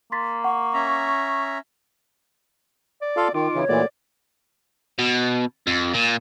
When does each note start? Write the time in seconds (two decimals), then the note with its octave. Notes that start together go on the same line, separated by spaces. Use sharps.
0.12 A#3 C6 A6 B6
0.44 F#5 C#6
0.74 C#4 E5 A#5
3.02 D5
3.17 F4 A4 F5
3.34 D#3 D#4 F4 D6
3.55 C#3 E3 C#5
3.69 A#2 E3 A3 A#3 F#4 D5
4.99 B2
5.67 F2
5.94 A#2